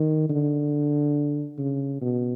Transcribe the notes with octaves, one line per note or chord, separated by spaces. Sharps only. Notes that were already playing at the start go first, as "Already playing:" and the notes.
Already playing: D#3
D3
C#3
B2